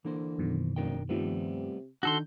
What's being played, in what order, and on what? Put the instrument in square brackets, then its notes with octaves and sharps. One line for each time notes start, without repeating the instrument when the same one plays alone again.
[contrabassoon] D3 [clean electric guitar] E3 A#3 C5
[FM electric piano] F#2 B2 D#3
[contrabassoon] F1 [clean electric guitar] D4 A#4 G5
[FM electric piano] G2 D#3 F3 [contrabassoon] C3 [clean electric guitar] G3 A3 B3
[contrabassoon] D3 [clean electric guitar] D#3 D#4 [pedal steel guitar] F#4 A4 C6 [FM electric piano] G6